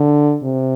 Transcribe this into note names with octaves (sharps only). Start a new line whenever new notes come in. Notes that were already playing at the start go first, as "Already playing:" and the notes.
Already playing: D3
C3